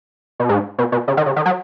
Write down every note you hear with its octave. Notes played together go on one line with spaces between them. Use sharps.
B2
G#2
B2
B2
C#3
D#3
C#3
D#3
F#3